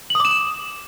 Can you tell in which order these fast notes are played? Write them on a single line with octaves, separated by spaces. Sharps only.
F#7 D#6 D6 E7